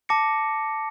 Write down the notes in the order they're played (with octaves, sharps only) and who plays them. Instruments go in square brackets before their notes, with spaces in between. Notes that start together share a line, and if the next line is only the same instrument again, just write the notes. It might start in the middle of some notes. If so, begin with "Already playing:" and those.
[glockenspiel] A5 D6 A#6 C#7